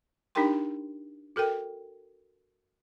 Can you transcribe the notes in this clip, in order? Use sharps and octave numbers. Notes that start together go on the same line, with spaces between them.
D4 D#4 G4 A#4 G5 C6
F#4 A4 A#4 G5